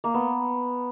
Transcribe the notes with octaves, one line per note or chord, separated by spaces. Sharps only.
A#3
B3